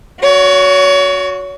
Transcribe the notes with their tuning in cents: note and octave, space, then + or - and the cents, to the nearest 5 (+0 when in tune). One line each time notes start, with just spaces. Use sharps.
F#4 -10 C#5 +30